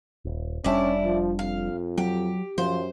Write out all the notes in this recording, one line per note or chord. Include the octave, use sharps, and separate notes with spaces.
D#1
F1 G3 C#4 D4 E4 D5
F3
F2 F5
F#3 G4
F#2 F3 C5